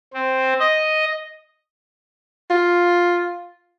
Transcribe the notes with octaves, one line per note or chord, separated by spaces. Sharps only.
C4
D#5
F4